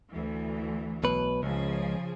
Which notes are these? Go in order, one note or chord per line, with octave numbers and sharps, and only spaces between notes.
D2 E3
B1 B2 B4
C#2 C#3 F3 G#4